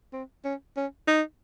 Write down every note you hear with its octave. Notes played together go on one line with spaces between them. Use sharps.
C4
C#4
C#4
D#4